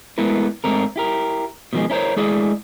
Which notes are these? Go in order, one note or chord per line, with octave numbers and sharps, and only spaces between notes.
G#3 A3 B3 E4 A#4
G#2 A3 C4 A#4
E4 G4 A#4
B2 D#3 F3 F#3 G#3
C#4 E4 A#4 C5 C#5
G#3 A3 D4 E4 G#4 D5